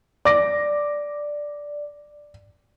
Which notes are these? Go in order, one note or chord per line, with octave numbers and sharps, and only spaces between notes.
D5 D6 A#6